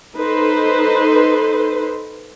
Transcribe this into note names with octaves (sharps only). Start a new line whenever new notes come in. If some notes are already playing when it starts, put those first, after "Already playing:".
D#4 A4 B4 C5